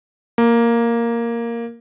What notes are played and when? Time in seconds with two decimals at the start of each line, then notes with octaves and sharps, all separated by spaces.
0.38 A#3